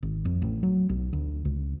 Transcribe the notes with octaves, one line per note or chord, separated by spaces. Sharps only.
G#1
F2
A1
F#3
B1
D2
C#2